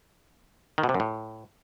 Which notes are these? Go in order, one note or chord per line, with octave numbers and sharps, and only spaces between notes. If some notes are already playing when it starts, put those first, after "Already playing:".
D#3
B2
C3
F#2
A2